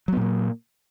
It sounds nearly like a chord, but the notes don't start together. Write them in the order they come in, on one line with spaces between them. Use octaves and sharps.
F#3 B3 A#2 A#3